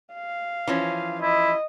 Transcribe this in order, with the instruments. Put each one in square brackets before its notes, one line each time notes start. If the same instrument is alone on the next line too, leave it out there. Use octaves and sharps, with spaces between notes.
[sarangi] F5
[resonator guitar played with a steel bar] E3 F3 C#4
[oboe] E4 [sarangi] D#5